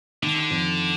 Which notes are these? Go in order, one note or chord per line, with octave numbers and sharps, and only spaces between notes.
D3 D#3
F2